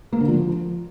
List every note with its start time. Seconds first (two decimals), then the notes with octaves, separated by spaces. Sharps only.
0.13 A#3
0.20 D3
0.28 F3